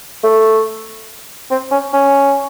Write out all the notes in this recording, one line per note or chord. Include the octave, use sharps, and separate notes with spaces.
A3
C4
C#4
C#4